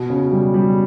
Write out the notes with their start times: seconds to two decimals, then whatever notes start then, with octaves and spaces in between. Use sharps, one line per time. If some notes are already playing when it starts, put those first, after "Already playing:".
Already playing: B2
0.10 C#3
0.32 G3
0.54 G3